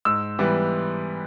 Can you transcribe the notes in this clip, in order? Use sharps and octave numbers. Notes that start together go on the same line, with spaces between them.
G#2 E6
E3 G3 B3